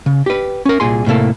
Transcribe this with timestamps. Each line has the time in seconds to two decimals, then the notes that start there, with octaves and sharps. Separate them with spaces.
0.06 C#3
0.26 G4 B4
0.65 C#4 A#4
0.80 C2 A#2 G#4 C6
1.06 A2 C3 A#3 A4